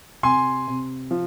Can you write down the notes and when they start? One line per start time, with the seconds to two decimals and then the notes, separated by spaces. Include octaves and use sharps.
0.23 C3 G#5 C6
0.67 C3
1.11 F3